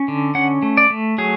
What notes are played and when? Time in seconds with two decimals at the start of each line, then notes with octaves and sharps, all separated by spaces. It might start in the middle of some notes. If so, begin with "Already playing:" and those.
Already playing: C#4
0.08 D3
0.35 C#4 F#5
0.62 A3
0.77 D5
0.90 A3
1.18 F#3 G#4